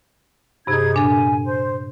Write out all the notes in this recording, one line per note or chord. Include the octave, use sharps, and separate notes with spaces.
G2 C3 D#4 G#4 G#6
A#2 D4 A4 G#5
C5